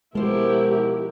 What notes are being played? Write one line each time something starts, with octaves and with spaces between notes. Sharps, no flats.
B2 F3 G#3 E4 G4 A#4 C5